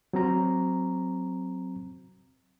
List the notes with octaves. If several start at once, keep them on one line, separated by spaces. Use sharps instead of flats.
F#3 C4 A#5